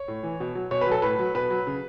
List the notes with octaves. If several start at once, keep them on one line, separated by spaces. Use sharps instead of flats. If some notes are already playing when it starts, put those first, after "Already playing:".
Already playing: C#5
A2
E3
B2
F#3
B2 C#5
B4
F#3 A4
A2 B4
F#3
B2 B4
F#3
C#3